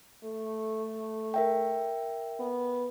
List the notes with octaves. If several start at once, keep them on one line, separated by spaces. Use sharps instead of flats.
A3
A#4 E5 G5
B3